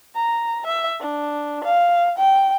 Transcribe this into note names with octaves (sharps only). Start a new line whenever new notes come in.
A#5
E5
D4
F5
G5